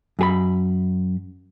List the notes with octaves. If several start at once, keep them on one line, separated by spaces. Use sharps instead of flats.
F#2 G#4 B5